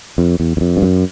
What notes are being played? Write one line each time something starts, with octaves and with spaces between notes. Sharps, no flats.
F2
E2
E2
F2
G2
F#2